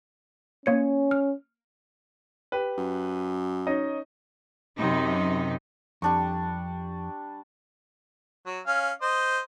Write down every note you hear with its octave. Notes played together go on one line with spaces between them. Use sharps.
A#3 C#4 C#5 C#7
F6
G4 B4
F#2
C#4 D#4 D#5
F#2 C3 D#4
F2 G3 D4 C#6
F#3
C#4 F5
C5 D#5